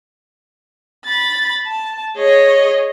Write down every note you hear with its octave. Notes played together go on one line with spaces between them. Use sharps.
B5 A6
A5
G#4 C#5 D#5